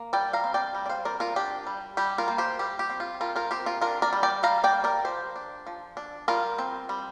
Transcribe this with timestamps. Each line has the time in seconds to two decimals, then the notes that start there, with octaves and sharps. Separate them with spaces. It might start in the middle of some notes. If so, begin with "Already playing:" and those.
Already playing: A#3
0.13 G3 D5 G5
0.33 F5 A#5
0.44 C4
0.54 D5 G5
0.75 G3
0.86 D5
0.89 C5 F5
1.05 C4 A#4 D5
1.20 F4 A#4
1.36 D4 G4
1.67 G3
1.97 G3 G4
2.18 F4 A#4
2.28 A#3
2.38 G4 C5
2.59 G3 G4
2.79 G4
2.90 C4
3.00 F4
3.20 G3 F4 A#4
3.36 F4 A#4
3.51 C4 G4 C5
3.66 F4 A#4
3.81 D4 F4 A#4
4.02 A#4 D5
4.13 G3
4.23 D5 G5
4.43 G3 F5 A#5
4.64 D5 G5
4.74 A#3
4.84 A#4 D5
5.05 F3 G4 C5
5.36 D4
5.67 F3
5.97 D4
6.28 G3 F4 A#4
6.59 C4
6.89 G3